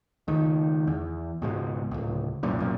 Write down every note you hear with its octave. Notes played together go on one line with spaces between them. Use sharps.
C#2 D#3
E2
C#2 G#2 B2
D1 C#2
C2 F#2 A#2
B1 F#2 A#2